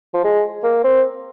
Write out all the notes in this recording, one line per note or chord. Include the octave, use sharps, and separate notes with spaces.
F3
G#3
A#3
C4